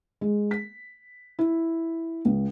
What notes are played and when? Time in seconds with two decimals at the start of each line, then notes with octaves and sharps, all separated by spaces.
0.21 G#3
0.51 B6
1.39 E4
2.25 C#2